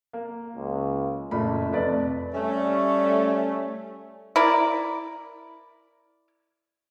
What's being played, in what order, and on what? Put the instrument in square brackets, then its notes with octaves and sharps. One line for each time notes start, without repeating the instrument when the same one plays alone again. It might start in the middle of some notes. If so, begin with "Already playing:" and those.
[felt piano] A#3
[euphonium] C#2
[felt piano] F#1 A#2 B5 [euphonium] A3
[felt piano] F1 B4 D5
[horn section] G3 A3 C#4
[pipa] E4 A#4 D5